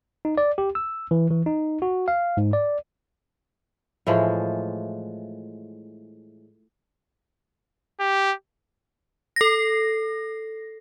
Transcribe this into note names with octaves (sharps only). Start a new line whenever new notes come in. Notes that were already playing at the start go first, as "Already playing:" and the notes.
D#4
D5
G4
E6
E3
E3
D#4
F#4
F5
G#2
D5
A2 E3 F3 G#3
G4
A4 A#6